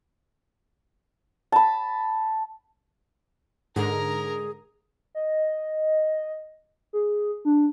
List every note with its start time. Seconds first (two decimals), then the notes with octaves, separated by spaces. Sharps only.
1.52 A5 B5
3.76 G#2 D3 G#4 A#4 A#5
5.15 D#5
6.93 G#4
7.45 D4